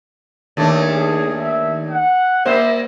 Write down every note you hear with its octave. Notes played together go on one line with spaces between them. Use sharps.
D#2 A3 D4
G#4
E5
F#5
G3 A#3 C5 E5